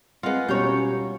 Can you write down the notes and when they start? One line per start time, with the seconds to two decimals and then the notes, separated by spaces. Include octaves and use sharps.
0.23 G#3 C4 F4 B4 F#5
0.49 B2 G3 C#4 C#5 A#5 G6